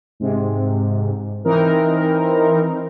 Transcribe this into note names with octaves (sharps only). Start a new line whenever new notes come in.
G#2 C3
E3 C4 D#4 A#4